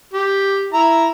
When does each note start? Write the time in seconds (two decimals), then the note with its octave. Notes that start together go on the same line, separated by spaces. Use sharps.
0.14 G4
0.73 E4 A#5